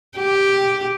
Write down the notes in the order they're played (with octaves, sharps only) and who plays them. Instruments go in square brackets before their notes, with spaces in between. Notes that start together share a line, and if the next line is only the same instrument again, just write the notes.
[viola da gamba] G4